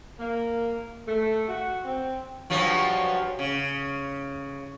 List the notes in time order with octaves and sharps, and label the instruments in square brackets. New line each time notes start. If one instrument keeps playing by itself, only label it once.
[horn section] A#3
A3
F#4
C4
[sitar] G2 F3 F#3
C#3